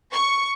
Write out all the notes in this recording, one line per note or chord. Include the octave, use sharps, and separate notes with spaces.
C#6